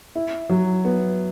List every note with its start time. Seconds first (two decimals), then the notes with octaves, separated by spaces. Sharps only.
0.15 E4
0.49 F#3
0.85 B3